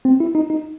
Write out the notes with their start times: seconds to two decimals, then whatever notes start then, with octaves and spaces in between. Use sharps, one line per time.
0.05 C4
0.20 E4
0.35 D#4
0.50 D#4